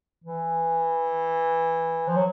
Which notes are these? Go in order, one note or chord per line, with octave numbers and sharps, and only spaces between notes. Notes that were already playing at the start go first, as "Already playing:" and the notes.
E3
F3
F#3